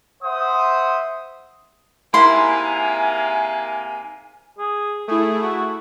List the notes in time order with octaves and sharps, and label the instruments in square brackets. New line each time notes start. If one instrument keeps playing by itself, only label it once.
[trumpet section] C5 E5 F#5 D#6
[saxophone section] G#2 C3 A#3 [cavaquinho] E4 C6 [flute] G#5
[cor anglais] G#4
[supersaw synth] A3 E4 [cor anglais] G#4
[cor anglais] F#4